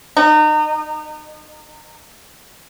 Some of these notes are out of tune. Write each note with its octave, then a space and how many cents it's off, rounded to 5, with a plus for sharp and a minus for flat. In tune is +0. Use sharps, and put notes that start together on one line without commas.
D#4 -30